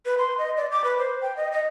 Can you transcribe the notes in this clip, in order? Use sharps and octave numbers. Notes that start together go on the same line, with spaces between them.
B4
C6
D#5
D5
D6
B4
C5
G5
D#5
D#5